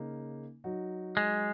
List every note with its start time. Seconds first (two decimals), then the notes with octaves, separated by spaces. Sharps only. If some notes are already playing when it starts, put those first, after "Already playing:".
Already playing: C#3 A#3 D#4
0.64 F#3 D#4 F#4
1.17 G#3